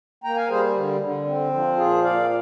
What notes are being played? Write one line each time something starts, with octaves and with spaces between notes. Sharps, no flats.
A#3 G5 A#5
F5 G#5
G3 G#4 C5
D3
D3
C4
F3
A#2 F4 G#4
A#2 D5 F5